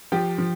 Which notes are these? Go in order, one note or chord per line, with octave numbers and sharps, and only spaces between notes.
F3 G4
F3